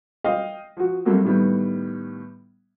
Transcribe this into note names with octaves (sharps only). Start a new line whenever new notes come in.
D#5 F5 G5
F3 F#4
F#3 G3 A3 A#3 C4 F#4
A2 D#3 G3 B3